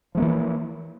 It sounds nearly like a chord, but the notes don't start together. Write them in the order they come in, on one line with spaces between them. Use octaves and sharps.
F3 A3 A#3 E3